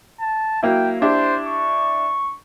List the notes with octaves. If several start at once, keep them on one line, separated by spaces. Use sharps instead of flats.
A5
F#3 A#3 E4 G5
D4 E4 G4 C5
C#6